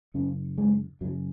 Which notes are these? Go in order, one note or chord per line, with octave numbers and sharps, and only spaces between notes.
F#2 C#3 C#4
G#3
F#2 C#3 F#3